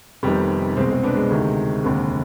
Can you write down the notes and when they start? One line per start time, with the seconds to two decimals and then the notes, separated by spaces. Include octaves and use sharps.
0.23 F1 F2 C3 D#3 G3 B3
0.77 C2 B2 G#3 C4
0.90 G#3 C4
1.03 B3 D4
1.16 G#3
1.30 D2 C3 D#3
1.84 F1 D#2 D3